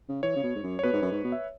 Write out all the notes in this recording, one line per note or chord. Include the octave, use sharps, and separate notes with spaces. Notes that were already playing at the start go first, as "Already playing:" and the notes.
C#3
E3 C#5
C#3
B2
G#2
F#2
C#5
B2 B4
G#2
F#2
G#2
B2
E5